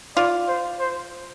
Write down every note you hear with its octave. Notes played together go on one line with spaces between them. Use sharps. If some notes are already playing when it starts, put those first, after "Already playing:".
F4 D5
C5
C5